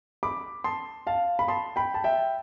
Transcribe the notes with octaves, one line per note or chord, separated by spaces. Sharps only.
B5 D6
A5 C6
F5 A5
B5
A5 C6
G5 B5
A5
E5 G5